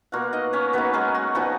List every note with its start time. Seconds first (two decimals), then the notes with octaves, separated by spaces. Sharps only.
0.12 B2 A#3 F4 F#4 F#5
0.33 D#4 D#5
0.53 C#4 C#5
0.73 F#3 A#3 B3 D#4 B4
0.94 G#3 G#4
1.15 F#4
1.35 A#2 F3 B3 D#4 F#4